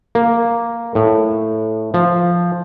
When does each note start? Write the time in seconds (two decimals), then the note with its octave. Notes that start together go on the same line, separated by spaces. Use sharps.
0.15 A#3
0.95 A2
1.94 F3